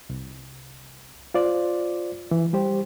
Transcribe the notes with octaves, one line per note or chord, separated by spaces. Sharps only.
C2
F4 C5 D5
E3
G3 G4 C5